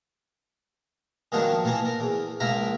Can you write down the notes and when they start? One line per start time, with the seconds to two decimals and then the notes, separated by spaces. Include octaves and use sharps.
1.32 D#3 F3 F#3 A#3 B3 D4
1.64 A#2 E3 A#3 A5 A#5
1.85 A#4
2.00 E2
2.40 C#2 F3 A#3 A#4 E5 A#5